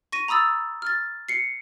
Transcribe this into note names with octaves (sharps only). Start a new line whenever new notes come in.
C#6 A#6 D#7
A#5 B5 D#6 E6 A6
F6 A6
C7 C#7